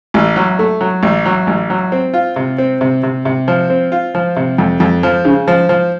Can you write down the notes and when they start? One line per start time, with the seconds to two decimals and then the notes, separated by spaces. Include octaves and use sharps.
0.14 A1
0.36 F#3
0.59 A3
0.81 F#3
1.03 A1
1.25 F#3
1.47 A1
1.70 F#3
1.92 C4
2.14 F4
2.36 C3
2.58 C4
2.81 C3
3.03 C3
3.25 C3
3.48 F3
3.70 C4
3.92 F4
4.15 F3
4.36 C3
4.58 F2
4.80 F2
5.03 F3
5.25 C#3
5.48 F3
5.69 F3